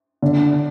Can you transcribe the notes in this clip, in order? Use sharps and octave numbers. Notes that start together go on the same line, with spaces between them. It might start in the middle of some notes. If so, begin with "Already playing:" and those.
D3